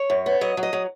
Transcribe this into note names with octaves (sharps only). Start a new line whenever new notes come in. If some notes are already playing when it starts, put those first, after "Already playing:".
Already playing: C#5
F#2
B3
F#3 D#5
F#3
D#5
F#3